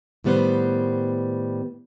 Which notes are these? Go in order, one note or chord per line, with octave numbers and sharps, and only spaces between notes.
A2 D#3 G3 B3 B4 C5